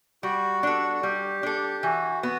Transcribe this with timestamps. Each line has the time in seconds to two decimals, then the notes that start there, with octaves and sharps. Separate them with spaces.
0.23 G3 F#4
0.63 D4 A4
1.03 G3 G4
1.43 D4 A4
1.83 E3 F#4
2.23 B3 F#4